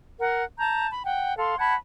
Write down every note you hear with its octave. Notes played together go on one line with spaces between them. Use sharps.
A#4 F#5
A5 A#5 G6
B5
F#5 G5
A4 F5 C6
F#5 A5 B5 G#6